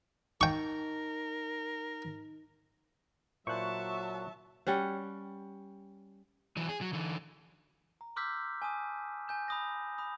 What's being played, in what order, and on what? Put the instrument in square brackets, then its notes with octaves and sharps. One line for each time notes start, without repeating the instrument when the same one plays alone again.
[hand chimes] D#4 [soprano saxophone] A#4 [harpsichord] G5 C#6
[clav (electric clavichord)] A#2 E4 C5 [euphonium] F#3 [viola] E5 A5 [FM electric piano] C#6 F#6
[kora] G3 C#4 F#5
[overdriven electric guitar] E3 F#3
G#4
F#3
D3 E3
[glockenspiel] A#5
C6 D6 E6 F6 G6 B6
G#5 A5 D#6
G#5 G6 E7
B5 D#6 A#6
B5 D#6